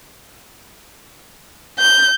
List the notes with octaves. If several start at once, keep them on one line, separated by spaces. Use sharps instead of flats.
G6